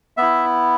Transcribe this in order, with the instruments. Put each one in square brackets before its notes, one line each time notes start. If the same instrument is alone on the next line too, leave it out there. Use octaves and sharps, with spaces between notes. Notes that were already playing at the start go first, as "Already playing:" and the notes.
[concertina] B3 E4 E5